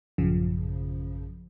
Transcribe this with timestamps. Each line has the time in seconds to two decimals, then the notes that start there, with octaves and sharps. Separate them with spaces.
0.18 A1 F#2 C#3 F3